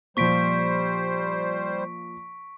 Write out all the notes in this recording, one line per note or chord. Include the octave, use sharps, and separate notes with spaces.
A#2 F3 G3 C5 C#6 B6 D7